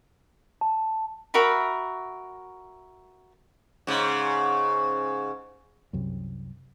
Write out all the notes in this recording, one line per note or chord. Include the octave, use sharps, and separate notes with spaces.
A5
F#4 A#4 E5 B5
G#2 C#3
C2 F#2